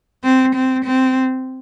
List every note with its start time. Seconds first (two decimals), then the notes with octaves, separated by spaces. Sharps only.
0.24 C4
0.55 C4
0.85 C4